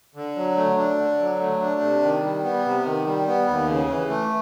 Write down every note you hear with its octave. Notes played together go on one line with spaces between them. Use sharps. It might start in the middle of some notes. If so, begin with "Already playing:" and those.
D3
F#3
A3
D4
D3
F#3
A3
D4
C3
D#3
G3
B3
C3
D#3
G3
B3
D#2
C#3
E3
A3